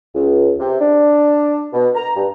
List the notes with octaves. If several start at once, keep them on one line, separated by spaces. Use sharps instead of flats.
C#2
C3
D4
B2
A#5
G2